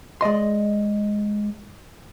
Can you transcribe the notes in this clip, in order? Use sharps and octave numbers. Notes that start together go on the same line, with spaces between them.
G#3 D5 D#5 C6